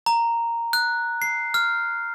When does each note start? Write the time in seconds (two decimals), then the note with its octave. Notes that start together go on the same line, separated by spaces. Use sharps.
0.06 A#5
0.73 F#6
1.22 C7
1.54 F6